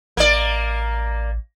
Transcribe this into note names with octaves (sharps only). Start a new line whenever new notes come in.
A1 A#3 D5